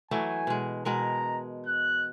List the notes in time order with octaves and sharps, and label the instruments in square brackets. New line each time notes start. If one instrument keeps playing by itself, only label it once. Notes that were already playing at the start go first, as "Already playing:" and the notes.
[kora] E3 F#3 A3 [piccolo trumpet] G#5
[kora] B2 G#3
[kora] B2 G#3 A#4 [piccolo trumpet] A#5
[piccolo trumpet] F#6